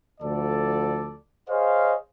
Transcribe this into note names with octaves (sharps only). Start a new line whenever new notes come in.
D2 F3 A4 D5
G#4 C5 C#5 D#5 F5